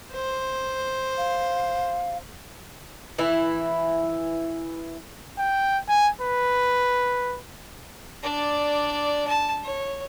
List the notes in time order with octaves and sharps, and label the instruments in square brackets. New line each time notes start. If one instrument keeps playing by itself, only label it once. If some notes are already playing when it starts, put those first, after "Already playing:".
[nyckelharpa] C5
[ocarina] F5
[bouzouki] E3 E4
[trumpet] G5
G#5
B4
[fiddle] D4 D5
A5
C#5